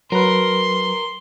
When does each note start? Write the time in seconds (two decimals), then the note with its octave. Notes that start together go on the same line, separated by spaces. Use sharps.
0.12 F#3 A#4 B4 C6